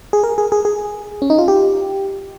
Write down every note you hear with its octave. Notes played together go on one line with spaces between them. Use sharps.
G#4
A#4
G#4
G#4
G#4
C#4
D#4
F4
G4